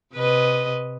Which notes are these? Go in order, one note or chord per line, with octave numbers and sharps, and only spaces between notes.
C3 B4 D#5